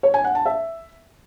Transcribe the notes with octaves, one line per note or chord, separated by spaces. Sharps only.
C#5
G#5
F#5
A5
E5